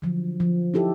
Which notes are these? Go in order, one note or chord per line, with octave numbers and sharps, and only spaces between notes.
D3 F3 F#3
F3
D#4 E4 G4 A4